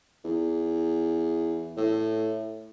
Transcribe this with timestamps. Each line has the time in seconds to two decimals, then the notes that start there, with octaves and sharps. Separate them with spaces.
0.24 E2
1.77 A2